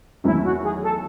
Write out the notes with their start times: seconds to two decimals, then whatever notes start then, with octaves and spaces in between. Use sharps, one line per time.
0.24 E2 D#3 F#3 A3 D#4 E4
0.43 F#4
0.63 G#4
0.82 A4